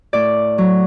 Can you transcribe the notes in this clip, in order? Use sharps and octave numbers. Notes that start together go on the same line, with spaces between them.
A2 D5
F#3